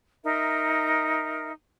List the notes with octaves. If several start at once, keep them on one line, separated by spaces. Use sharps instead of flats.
D#4 A#4 E5